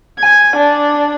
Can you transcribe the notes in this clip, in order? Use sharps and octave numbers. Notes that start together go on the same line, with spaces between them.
G#5
D4